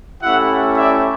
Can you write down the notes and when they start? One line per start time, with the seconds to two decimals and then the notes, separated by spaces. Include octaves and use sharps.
0.21 A3 C#4 E4 G4 E5 F#5
0.76 D5 E5